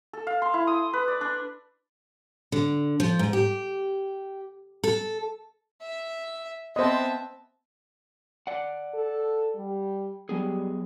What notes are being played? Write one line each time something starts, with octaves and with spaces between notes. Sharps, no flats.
A4
F5
C6
E4
D#6
B4
D5
D4
D3
F3
G#2
G4
A4
E5
B3 C4 C5 D#5 E5 A5
D5 F#5
A4
G3
F#3 G3 B3 G#4